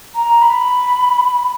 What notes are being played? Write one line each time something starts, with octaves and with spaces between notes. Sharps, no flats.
A#5
B5